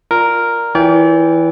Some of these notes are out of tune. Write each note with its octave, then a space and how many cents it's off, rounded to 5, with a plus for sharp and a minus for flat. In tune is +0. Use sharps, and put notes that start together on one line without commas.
F4 +0 A#4 +0 D5 +0
E3 +0 D5 -40 G5 +0